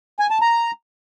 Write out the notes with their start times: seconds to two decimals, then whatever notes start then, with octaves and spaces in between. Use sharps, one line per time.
0.19 G#5
0.30 A5
0.41 A#5